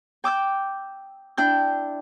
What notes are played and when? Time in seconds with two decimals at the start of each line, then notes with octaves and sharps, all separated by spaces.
0.24 G5 D6 E6 G6
1.38 D4 E4 G5 G6